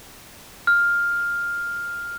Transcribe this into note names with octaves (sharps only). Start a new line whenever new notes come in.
F6